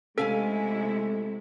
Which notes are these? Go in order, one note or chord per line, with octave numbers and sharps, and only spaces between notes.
C3 G#3 A3 C#4 E4 A4 F5 G#5